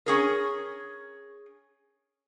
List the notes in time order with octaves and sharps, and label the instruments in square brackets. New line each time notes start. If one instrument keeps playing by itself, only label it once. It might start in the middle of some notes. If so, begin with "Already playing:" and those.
[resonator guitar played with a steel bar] C#4 G#4 A#4